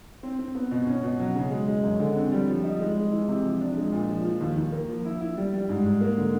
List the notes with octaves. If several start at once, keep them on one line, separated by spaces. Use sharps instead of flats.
C4
C4
B3
B2
C#4
B2
F#3
C#3
G#3
G#3
F#2
D3
C4
G3
F3
D#4
G#3
G#3
E3
C3
F3
D4
G#3
A#2
F3
F3
D#2
D#2
A#3
F3
E4
E4
G3
G3
G#2
G#2
A#3
D3